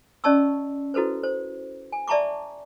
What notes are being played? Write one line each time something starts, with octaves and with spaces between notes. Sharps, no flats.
C#4 D5 D#5 A5 C#6 E6
E4 F#4 A4 B4 C5
C5
G#5
D5 E5 A5 A#5 C#6 D6